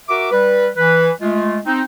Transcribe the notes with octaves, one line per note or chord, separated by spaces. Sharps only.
F#4 A#4 E5 D6
G3 B4
E3 B4
G#3 A3 F4
C4 D#4